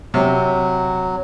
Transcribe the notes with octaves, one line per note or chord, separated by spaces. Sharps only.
C3 F#3